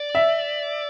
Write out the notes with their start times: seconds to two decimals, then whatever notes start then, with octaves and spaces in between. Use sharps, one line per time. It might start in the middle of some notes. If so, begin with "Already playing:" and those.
Already playing: D5
0.15 E5